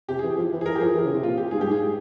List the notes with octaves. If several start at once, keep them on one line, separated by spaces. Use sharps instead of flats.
C3 G4
G#4
E3
F3
E3
G#4
E3 A#4
G4
F3 G#4
E3
C#3
C3
A#2 F4
G4
G#2 G#4
G2 G4
G#2
G#4